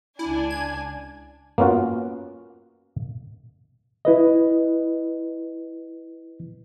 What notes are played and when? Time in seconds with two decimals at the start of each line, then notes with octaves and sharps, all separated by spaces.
0.19 C#2 D4 E4 G#5
0.50 G#6
1.58 A#3 B3 C#4 F4 F#4
4.05 E4 B4 D#5